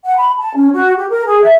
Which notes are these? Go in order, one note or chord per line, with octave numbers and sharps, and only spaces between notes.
F#5
B5
A5
C#4
F#4
G4
A#4
G#4
E5